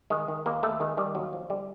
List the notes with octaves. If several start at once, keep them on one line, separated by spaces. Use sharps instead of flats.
D#3 G#3
D#3
D#2 A#3
D#2 A3
D#3 G#3
D#3 G3
D#2 F#3
F3
D3 G3